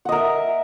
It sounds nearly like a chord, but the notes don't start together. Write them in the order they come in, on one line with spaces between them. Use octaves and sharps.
F#5 D#5 A#4 E5